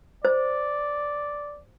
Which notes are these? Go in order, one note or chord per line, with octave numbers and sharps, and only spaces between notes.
C5 D5